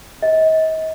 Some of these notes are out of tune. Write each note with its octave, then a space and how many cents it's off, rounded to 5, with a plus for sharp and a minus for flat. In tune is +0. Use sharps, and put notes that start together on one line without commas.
D#5 +35